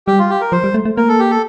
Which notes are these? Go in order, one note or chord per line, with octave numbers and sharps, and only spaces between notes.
G3 G4
F4
G4
A#4
F3 C5
G3
A3
A3
A#3 A#4
A4
G4
A4